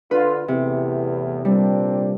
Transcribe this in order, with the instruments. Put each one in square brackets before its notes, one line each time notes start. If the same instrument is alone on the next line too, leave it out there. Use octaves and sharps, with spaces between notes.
[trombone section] D3 F4 [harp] B4
[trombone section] E2 A2 [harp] C3
[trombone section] A#2 C4 D4 [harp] G3